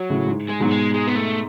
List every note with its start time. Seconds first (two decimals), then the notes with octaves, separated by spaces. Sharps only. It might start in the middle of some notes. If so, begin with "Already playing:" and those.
Already playing: F#3
0.10 A2 C#3
0.26 G#2
0.49 G#3
0.60 G#2 B2 F#3
0.71 G#3
0.94 G#3
1.07 B3
1.16 A3